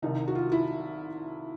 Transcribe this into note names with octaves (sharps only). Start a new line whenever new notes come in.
C2 C3 D#3 D#4
F#4
F4
E4